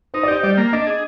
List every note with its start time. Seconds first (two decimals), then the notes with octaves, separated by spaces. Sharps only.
0.14 D#4 C5
0.23 D5
0.28 G4 C5
0.43 G3 D5
0.58 A#3
0.73 D4 D#5
0.87 G#4